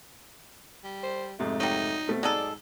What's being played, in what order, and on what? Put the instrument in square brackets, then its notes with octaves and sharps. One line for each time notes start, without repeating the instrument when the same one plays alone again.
[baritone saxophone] G3
[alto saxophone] C5
[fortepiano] F2 G#2 C3 [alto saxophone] A3
[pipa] F#3 G3 [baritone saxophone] D#4
[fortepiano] B2 A3 C4
[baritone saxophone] G#2 [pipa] F#3 D#4 A4 [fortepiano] G#4 [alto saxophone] D5